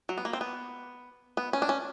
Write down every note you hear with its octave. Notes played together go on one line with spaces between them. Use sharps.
F#3
B3
A#3
C4
B3
B3
C#4
D4
C#4